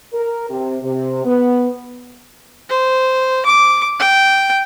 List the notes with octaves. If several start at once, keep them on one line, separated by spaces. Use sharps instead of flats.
A#4
C3
C3
B3
C5
D6
G5